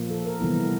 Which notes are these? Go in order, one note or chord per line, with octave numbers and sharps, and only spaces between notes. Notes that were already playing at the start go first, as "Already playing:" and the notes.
Already playing: A#2 F3 A#3
A4
A#4
C3 E3 G3 B3 E4